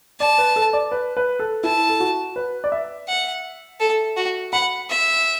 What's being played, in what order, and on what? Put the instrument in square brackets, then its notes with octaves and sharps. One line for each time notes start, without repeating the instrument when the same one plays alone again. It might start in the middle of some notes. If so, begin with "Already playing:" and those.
[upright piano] D5 [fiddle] A5
[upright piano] B4
A4
D5
B4
B4
A4
[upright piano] E4 [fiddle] A5
[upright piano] A4
F#4
B4
D5
E5
[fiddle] F#5
A4
F#4
[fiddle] F#5 [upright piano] B5
[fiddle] E5